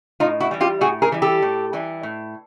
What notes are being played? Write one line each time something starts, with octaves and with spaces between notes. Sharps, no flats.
A2 D#4 F4
E4 F#4
E3 G3
F4 G4
A2 F#4 G#4
G#4 A#4
E3 G3
G4 A4
A2
E3 G3
A2